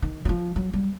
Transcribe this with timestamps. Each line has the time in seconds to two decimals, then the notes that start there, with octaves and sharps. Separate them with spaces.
0.02 D#3
0.25 F#3
0.29 F3
0.56 F#3
0.73 G3